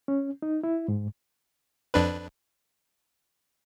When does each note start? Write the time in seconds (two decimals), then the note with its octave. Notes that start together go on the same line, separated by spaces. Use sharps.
0.08 C#4
0.42 D#4
0.64 E4
0.88 G#2
1.94 F2 D4 B4